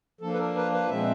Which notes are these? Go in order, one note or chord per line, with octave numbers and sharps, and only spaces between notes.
F3 A#3 D4 A4
B4
A#4
B4
B4
A#2 F3 G#3 C4 E5